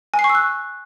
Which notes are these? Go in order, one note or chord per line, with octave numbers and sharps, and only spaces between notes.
G#5
C7
C#6
E6
F#6